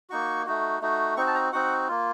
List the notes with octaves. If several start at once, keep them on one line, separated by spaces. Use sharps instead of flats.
A#3 D#4 F#4 C#6
A3 D#4 F#4
A3 D#4 F#4
C4 D#4 F#4 C#6
A5
A#5
C4 D#4 F#4 F#5
A#3 F4